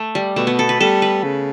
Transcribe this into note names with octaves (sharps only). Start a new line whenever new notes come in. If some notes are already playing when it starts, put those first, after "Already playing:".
Already playing: A3
G3
B2 A3
B3
A4
B4
G3 A4
B4
C#3